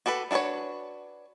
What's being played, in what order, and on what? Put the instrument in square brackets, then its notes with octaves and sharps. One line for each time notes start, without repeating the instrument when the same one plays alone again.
[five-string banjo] F#4 G4 A4 B4
D4 F#4 A4 B4 C#5